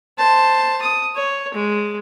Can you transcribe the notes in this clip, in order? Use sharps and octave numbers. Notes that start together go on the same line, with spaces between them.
C5 A5
D#6
C#5
G#3